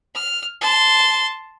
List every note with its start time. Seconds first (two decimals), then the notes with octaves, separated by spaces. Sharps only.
0.14 F6
0.61 A5 C6